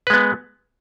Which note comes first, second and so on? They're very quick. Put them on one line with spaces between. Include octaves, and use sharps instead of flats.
B4 G#3 B3